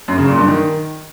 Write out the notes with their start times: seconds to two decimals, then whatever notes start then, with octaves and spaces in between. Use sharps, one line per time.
0.08 F#2
0.18 C#3
0.28 A#2
0.38 G2
0.48 D#3